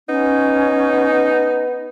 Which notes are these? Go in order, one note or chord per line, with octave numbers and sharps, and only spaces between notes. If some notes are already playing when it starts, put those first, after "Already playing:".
B3 C#4 D#4